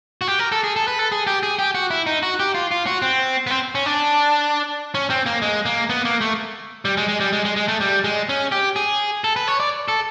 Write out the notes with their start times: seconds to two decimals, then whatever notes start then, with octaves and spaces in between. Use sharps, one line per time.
0.21 F#4
0.28 G4
0.39 A#4
0.52 A4
0.64 G#4
0.76 A4
0.88 B4
0.99 A4
1.12 G#4
1.27 G4
1.43 G#4
1.59 G4
1.75 F#4
1.91 E4
2.07 D#4
2.23 F#4
2.40 G4
2.55 F4
2.71 F4
2.86 F#4
3.02 C4
3.47 B3
3.51 C4
3.75 C#4
3.86 D4
4.95 C#4
5.10 C4
5.26 A#3
5.42 G#3
5.66 A#3
5.90 B3
6.05 A#3
6.21 A3
6.85 G3
6.97 G#3
7.08 G#3
7.20 G3
7.33 G#3
7.45 G#3
7.56 G#3
7.68 A3
7.81 G3
8.04 G#3
8.29 C#4
8.52 G4
8.76 G#4
9.24 A4
9.36 B4
9.48 C#5
9.60 D5
9.88 A4